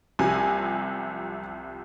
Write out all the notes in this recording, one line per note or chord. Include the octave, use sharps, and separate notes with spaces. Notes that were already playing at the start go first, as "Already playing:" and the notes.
C2 C3 F3 G#5